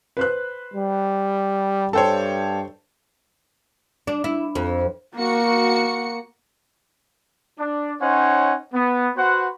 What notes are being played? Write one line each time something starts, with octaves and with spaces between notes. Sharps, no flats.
B4 C5 F#6
G3
G2 A4 C5 C#5 G5 A5
D4
E4
F2
A#3 F#4 C#7
D4
C#4 D#4 C5 C#5 F#5
B3
F#4 B4 C5 F#5